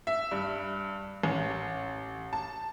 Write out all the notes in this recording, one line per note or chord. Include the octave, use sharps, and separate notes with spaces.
E5
G2
A1
A5